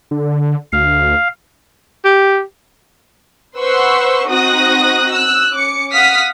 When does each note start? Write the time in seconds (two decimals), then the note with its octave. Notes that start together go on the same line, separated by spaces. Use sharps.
0.11 D3
0.73 D2 F5
2.05 G4
3.57 B4 C5 F#5 C6 C#6 E6
4.27 C4 D#4 F#4 D#6 F#6 A#6
5.11 E6 F#6
5.53 C#4 D6 C#7
5.93 F5 F#5 D#6 F6 B6